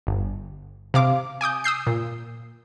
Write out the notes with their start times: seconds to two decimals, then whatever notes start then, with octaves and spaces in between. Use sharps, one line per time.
0.07 G1
0.94 C3 F5 D6
1.41 G#5 D6 D#6 G6
1.64 D#6 E6 G6 C7
1.87 A#2